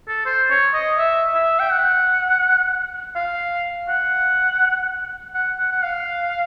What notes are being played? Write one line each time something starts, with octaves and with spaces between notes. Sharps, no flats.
A4
C5
C#5
D#5
E5
E5
G5
F#5
F5
F#5
F#5
F#5
F#5
F5